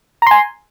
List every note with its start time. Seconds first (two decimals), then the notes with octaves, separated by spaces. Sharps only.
0.22 A#5
0.27 C6
0.31 G#5